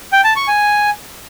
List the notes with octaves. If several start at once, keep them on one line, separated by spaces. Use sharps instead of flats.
G5
A5
C#6
G#5